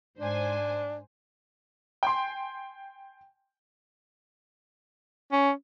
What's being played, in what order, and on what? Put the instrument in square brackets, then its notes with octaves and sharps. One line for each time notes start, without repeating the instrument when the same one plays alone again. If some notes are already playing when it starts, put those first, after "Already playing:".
[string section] G#2 C5 G#5 [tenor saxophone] D4
[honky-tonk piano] G5 G#5 C6
[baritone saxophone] C#4